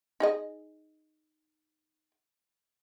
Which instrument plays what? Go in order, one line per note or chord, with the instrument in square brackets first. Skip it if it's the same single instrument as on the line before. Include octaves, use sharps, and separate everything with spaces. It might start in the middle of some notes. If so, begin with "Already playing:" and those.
[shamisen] D#4 G#4 D#5